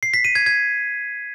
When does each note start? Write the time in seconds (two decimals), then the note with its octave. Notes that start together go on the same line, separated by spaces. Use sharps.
0.03 C7
0.14 B6
0.25 D#7
0.35 G#6
0.46 G#6